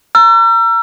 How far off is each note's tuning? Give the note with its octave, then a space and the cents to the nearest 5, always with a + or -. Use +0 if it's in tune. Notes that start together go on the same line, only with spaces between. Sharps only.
A#5 +0 E6 +40